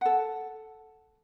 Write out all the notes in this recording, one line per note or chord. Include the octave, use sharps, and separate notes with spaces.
A4 F#5